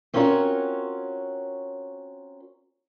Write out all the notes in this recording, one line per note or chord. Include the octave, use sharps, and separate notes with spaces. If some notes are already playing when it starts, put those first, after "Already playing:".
C4 C#4 F4 F#4 A#4 C#5